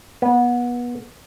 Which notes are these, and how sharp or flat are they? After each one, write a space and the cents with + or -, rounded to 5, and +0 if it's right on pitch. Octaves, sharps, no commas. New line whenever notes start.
B3 -25